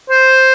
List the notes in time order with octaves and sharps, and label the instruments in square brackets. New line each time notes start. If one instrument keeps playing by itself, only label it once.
[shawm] C5